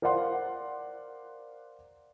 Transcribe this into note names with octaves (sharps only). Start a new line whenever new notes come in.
A#4 C5 D5 F5 F#5 C6